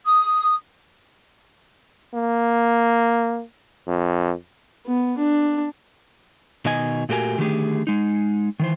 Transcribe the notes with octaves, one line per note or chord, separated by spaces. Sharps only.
D#6
A#3
F2
B3
D4
B2 D#3 D#5 G#5
A#2 A3 F#4 G4 A#4 G#5
D3 D#3 F#3 A3 G4 G#4
G#3 D#4
D#3 E3 C5